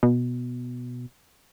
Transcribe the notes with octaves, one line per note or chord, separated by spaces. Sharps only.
B2